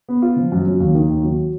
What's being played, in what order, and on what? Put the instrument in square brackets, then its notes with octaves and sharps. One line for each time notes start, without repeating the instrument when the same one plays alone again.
[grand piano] B3
F4
F3
F#2
F#3
D#2
D#3
D#2
F#3